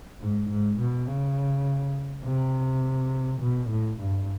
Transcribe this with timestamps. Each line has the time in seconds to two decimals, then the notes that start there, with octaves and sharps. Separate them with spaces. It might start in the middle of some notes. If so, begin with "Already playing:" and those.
0.21 G#2
0.49 G#2
0.80 B2
1.08 C#3
2.24 C3
3.41 B2
3.70 A2
3.99 G2